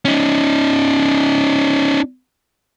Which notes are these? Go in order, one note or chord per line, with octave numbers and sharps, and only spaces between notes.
C#4 D#4